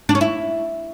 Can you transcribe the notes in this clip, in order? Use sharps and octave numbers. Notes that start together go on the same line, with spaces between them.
D4
C#4
E4